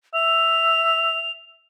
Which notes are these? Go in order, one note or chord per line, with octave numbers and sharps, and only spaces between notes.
E5 F7